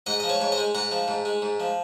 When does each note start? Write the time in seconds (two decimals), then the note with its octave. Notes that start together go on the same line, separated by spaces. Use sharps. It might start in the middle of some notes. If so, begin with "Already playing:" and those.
0.06 G#2 D#5 F#5
0.20 F3 D#5
0.29 C#5 F5
0.41 G#2 C#5
0.52 C5 D#5
0.58 G#3
0.75 G#2 F#5 A#5
0.91 F3
1.08 G#2
1.25 G#3
1.42 G#2
1.60 F3